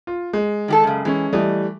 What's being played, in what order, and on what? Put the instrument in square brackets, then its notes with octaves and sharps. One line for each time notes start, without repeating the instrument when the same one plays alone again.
[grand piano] F4
G#3
[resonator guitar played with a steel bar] D#3 G4 A4
F#2 C#3
[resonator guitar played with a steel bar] E3 [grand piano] G#3 C#4
[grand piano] E3 G3 A3 [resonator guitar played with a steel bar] D#5